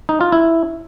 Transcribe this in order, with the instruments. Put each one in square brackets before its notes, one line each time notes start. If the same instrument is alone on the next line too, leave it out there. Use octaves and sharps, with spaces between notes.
[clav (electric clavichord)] D#4
F4
E4